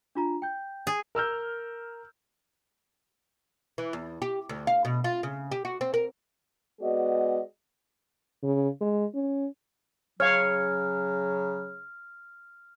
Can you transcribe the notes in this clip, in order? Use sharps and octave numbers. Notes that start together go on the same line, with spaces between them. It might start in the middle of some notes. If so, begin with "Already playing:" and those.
D4 F4 A#5
G5 G6
G#4
A#4 E6 F6 G6
E3
E2
G4
D2
F5
B2
F4
C#3
G4
F#4
C4
A#4
G#3 B3 F#4 G#4 D5 D#5
C#3
G#3
C#4
C#3 F#3 C#5 F5 F6